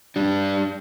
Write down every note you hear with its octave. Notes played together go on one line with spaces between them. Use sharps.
G3 D4